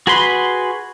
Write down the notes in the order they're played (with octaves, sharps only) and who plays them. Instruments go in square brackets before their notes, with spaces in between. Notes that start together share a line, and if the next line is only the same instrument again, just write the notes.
[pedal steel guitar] F#4 G#4 B4 B5 C6